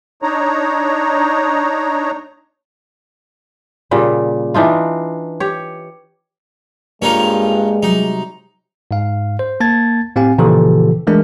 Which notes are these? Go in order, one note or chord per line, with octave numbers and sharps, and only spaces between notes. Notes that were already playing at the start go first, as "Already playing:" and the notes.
D4 D#4 C#5 A#5
A#2 C#3 G3
E3 D4 D#4 F4
G4 C#5
G2 G#3 A#3 C#4 D#4 F4
C3 F#3 G3 D#4
G#2 F5
C5
A#3 A5 G#6 A6
A2 C4 G4 F5 G#5
A#2 C#3 E3 F3 G4 A4
E3 G#3 A3 D4 A#4